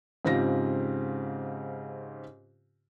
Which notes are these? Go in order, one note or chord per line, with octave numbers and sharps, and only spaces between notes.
G#2 C#3 C4 F4 G4 A#6